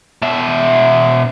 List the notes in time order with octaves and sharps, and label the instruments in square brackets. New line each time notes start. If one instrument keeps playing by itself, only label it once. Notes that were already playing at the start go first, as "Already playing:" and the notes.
[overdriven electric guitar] B2 E5